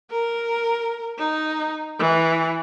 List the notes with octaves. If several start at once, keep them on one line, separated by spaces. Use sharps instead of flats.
A#4
D#4
E3